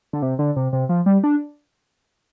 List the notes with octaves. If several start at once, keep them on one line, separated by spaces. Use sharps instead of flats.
D3
C3
D3
C3
C3
F3
G3
D4